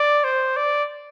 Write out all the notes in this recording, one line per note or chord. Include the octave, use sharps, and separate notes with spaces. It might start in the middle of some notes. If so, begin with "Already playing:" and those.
Already playing: D5
C5
D5